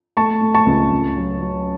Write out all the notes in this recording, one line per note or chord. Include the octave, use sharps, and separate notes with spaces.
A3 A5 C#6
A3
A5 C#6
C#2
C#2
F#3
F#3